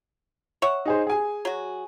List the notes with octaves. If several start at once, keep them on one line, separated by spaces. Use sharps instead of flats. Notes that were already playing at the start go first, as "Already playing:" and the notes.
C#5 E5 F#5
D#4 G#4 C5
G#4 G#5
F#3 F#4